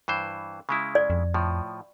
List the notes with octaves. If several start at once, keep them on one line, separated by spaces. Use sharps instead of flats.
G2 E3 C5
C#3 G#3 E4
D5
F2
A2 F3